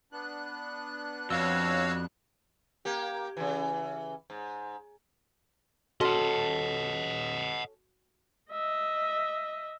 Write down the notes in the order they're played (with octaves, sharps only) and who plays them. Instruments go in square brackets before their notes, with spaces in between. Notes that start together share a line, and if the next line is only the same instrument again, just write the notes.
[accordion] B3 D4 F#6
[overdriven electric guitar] F2 [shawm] F#4 [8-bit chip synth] C#5 F5 E6
[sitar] A#3 G4
C#3 E3
G#2
[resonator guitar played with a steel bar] C#4 A4 [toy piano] F#4 [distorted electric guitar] D#5 F#5
[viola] D#5 E5